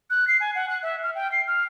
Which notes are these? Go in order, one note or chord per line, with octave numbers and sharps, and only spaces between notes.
F#6
C7
G#5
F#5
F#6
E5
F6
G5
C7
F6